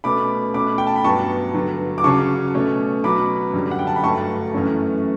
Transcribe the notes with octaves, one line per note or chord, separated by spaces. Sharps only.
B2 A3 C#4 B5 D6
B2 A3 C#4 B5 D6
G5
A5
B5
G2 F#3 B3 A5 C#6
G2 D3 F#3
D6
C#3 F#3 C#4 A5 C#6
B2 A3 C#4
B2 F#3 C#4 B5 D6
F#2 D3 G3
F#5
G5
A5
B5
G2 D3 F#3 A3 A5 C#6
F#2 E3 A3 C#4